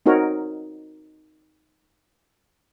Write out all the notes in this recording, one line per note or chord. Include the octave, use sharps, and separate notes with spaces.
C4 D#4 F#4 A#4 C#5